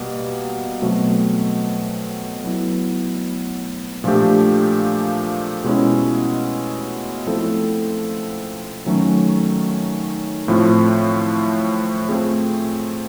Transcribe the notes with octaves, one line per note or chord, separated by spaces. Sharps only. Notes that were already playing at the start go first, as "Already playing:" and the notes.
Already playing: B2 G3 A#3
B2 F#3 A3 C4
F#3 B3 E4
A#2 F3 A3 D4 G4
B2 G#3 C#4 E4
F3 A3 C4 E4 A4
D#3 F#3 A3 C#4
A2 F3 A3 C4 F4
A3 C4 F4 G#4